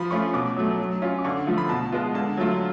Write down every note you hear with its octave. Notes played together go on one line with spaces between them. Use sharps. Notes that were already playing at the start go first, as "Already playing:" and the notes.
Already playing: F3 B5
A3 C#4 F4 C#6
B2 D6
F#3 A3
F#3
C#4 F4
D6
D3 C#6
F3 A3 F4
B5
B2 A5
G#3 B3 F4
D3 A5
F#3 A3 F4